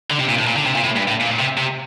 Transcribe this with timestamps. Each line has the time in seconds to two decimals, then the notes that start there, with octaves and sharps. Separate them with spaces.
0.10 D3
0.19 C3
0.29 A#2
0.38 A2
0.47 A#2
0.56 D3
0.65 C3
0.75 A#2
0.84 A2
0.96 G2
1.08 A2
1.21 A#2
1.40 C3
1.58 C3